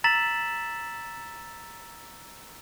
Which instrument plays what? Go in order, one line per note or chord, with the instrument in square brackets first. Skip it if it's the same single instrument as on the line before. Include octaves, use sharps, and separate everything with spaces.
[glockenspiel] A#5 E6 A6 B6 E7 F#7